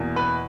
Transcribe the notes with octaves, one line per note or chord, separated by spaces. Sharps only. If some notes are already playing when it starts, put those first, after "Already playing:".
Already playing: E2 B2 A#3 E4
B4